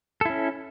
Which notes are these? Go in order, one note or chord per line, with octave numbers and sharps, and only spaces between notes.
C#4 E4 A4